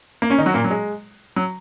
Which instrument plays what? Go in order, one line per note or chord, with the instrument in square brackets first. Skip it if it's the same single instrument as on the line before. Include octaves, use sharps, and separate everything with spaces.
[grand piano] A#3
C#4
D#3 D#4
F#3 F#4
A#2 A#3
F#3
G#3
F#3